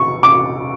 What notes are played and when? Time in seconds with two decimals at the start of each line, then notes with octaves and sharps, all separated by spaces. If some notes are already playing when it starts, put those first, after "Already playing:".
Already playing: C#6
0.23 D6